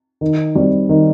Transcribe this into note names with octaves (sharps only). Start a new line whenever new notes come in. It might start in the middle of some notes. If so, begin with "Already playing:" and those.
D#3
G3 C4
D#3